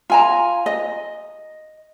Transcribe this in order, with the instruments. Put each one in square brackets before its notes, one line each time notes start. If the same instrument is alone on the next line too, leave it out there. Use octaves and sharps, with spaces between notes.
[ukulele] F4 G#5 A#5
D#5